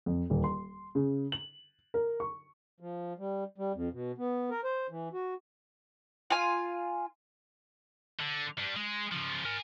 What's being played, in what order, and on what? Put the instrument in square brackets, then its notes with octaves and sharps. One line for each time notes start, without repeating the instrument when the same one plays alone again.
[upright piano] F2
D#1
C6
C#3
F#7
A#4
C#6
[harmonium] F3
G3
G3
F2
B2
B3
A#4
C5
E3
F#4
[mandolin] F4 G#5
[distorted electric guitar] D3
G3 D4
G#3
C#3 F3
A#4 G#5